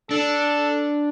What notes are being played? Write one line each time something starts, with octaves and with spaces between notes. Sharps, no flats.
D4 A4